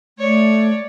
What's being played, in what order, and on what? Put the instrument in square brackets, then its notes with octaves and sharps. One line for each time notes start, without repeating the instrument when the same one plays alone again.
[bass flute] A3 [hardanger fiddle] C#5 D5